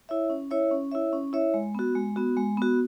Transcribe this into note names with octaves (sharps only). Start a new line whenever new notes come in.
E4 C#5 E5
C#4
E4 C#5 E5
C#4
E4 C#5 E5
C#4
E4 C#5 E5
G#3
B3 F#4
G#3
B3 F#4
G#3
B3 F#4